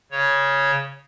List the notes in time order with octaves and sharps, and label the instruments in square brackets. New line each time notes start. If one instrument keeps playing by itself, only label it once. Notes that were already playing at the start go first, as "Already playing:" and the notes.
[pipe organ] C#3 C#5